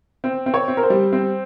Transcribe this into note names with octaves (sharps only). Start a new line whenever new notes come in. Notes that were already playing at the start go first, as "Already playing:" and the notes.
C4
C4
C#5
C4
A#4
C5
G3
C4